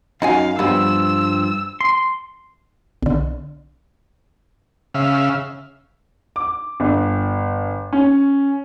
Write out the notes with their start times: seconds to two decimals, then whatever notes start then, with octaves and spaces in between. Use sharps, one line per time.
0.22 F#2 D#4 F#4 F5 G#5
0.59 G2 F3 G3 B3 E6
1.81 C6
3.03 B1 D3
4.94 C#3 E5 F5
6.36 D6
6.80 G1
7.93 C#4